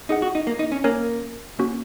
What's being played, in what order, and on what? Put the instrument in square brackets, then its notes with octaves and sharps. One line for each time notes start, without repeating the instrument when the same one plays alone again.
[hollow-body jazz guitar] D#4 [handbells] G#4 F#5
[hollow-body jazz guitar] F#4
D#4
A#3
D#4
C#4
[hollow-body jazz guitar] A#3 [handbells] C#4 A#4 C#5 G#5
[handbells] A#3 C#4 F#4